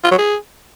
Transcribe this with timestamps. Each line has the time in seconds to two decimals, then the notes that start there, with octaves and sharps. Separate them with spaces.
0.04 F4
0.11 F#3
0.18 G#4